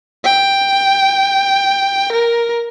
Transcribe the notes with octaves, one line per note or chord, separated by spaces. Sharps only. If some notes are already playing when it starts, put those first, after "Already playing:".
G5
A#4